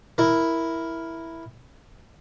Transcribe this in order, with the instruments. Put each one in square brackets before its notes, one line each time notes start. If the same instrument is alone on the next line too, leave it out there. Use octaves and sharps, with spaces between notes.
[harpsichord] E4 A#4